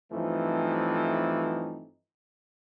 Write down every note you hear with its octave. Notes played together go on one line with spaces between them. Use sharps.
G2 E3 F3 A3 C4 D#4